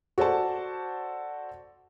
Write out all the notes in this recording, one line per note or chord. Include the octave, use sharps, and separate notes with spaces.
F#4 A4 C5 D5 A5